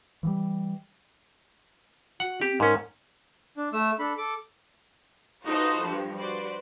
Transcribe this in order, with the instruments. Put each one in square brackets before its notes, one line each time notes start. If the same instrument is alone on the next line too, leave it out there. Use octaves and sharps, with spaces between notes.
[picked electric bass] E3 F3 G3
[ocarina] F#4 [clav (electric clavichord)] F#5
[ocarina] C4 [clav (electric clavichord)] G4
[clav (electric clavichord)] G#2 C#4 [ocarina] A#4
[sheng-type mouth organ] D4
A3 E6
D4 A4 B5
A4 D6
[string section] D#4 F4 F#4 A4 B4 C5
G2 F3
F#4 B4 C5 D5